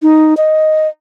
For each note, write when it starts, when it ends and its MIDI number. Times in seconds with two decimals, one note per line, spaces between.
0.02 0.34 63
0.37 0.88 75